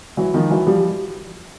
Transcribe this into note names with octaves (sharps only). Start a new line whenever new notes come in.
E3 F#3
D#3 F3
E3 F#3
F3 G3